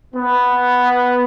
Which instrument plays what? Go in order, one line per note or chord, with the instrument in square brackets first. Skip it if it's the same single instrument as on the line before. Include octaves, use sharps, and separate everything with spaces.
[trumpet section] B3